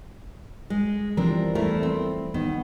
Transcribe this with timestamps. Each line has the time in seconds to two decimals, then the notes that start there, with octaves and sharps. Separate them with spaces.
0.70 G#3
1.17 E3 F3 G3 C4 D4 A#4
1.55 E2 A3 E4 A#4
1.83 C4
2.34 D#3 B3